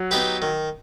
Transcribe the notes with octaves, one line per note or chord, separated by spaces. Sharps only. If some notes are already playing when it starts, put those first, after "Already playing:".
Already playing: F#3
B3 D#4 G4 B4
D#3